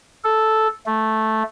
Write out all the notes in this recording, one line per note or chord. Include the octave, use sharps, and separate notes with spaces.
A4
A3